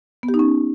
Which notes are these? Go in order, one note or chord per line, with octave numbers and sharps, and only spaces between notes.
B3
G4
D#4
C#4